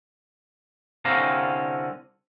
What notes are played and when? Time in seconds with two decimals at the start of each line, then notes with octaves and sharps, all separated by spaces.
1.05 C2 D3 C4 C#4 F5 A#5